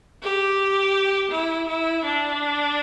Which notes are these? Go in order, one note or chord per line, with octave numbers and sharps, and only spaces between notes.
G4
E4
E4
D4